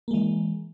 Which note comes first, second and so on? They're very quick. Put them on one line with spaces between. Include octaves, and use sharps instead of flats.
A#3 G#3 E3